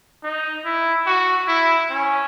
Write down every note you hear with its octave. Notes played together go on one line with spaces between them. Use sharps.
D#4
E4
F#4
E4
C#4